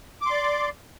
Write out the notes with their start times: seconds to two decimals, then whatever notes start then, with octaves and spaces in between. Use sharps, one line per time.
0.21 D6
0.26 C6
0.31 D5